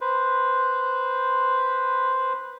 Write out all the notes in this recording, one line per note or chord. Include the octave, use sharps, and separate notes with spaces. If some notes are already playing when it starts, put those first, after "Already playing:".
B4 C5